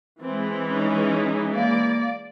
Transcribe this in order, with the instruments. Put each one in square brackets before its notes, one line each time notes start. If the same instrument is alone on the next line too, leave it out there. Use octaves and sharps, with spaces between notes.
[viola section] E3 G#3 [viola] C4
[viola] C#4 D#4
[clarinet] A#3 [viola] D5